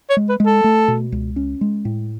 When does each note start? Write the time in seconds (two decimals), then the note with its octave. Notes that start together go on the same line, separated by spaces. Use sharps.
0.10 C#5
0.17 G#3
0.29 B4
0.40 G#3
0.46 A4
0.64 A3
0.88 B2
1.12 C#2
1.36 C#4
1.61 G#3
1.85 A2